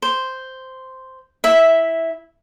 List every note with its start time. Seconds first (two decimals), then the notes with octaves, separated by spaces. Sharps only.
0.02 C5
1.44 E4 E5